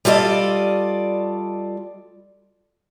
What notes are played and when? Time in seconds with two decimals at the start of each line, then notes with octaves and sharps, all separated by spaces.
0.05 G3 F4 A4 D5 D#5